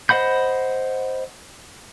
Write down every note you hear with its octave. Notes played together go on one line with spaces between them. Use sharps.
C5 D#5 F#5 B5 G6